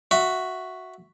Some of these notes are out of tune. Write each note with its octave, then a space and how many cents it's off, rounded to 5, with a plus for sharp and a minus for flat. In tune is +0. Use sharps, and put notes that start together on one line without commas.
F#4 +0 E5 +0